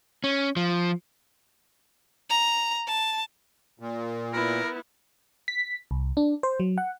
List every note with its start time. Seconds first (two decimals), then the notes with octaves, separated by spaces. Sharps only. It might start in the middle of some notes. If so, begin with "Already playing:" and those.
0.24 C#4
0.56 F3
2.30 A#5
2.87 A5
3.79 A#2
4.33 B3 E4 A#4
5.48 B6
5.91 C2
6.17 D4
6.43 C5
6.60 F#3
6.78 F#5